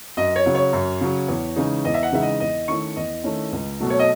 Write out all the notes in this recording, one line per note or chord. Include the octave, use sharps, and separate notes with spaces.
F#2 D#5
C#5
C#3 F#3
C#5
F#2
C#3 F#3
E2
C#3 E3 G#3 D#4
E2 D#5
E5
F#5
C#3 E3 G#3 D#4 E5
D#5
E2 D#5
D#3 A3 C#4 E4 C#6
E2 D#5
D#3 A3 C#4 E4
C#2
B2 F#3 A3
C#5
D#5